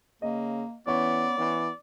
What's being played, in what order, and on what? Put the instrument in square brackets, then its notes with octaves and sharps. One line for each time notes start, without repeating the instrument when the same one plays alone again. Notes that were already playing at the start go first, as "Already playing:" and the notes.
[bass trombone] C#3 [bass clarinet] A#3 [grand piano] D#5
[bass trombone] E3 [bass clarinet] B3 [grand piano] C#4 C#5 C#6 [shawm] D5
[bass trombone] E3 [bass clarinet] B3